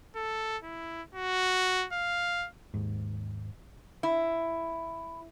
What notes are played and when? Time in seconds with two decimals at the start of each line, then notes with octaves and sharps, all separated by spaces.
0.16 A4
0.63 E4
1.15 F#4
1.93 F5
2.74 D#2 G#2
4.03 E4